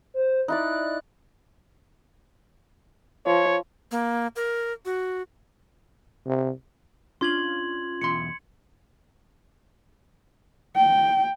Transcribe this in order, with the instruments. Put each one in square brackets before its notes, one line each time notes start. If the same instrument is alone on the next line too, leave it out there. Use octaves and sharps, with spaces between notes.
[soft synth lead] C5
[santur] D#4 E4 D5 [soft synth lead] F#6
[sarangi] F3 [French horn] C#5
[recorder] A#3
A#4
F#4
[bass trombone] C3
[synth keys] C#4 D4 F4 [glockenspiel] C6 G#6 F#7
[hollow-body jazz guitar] B1 E2 C6 [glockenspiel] C#7
[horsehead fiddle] G5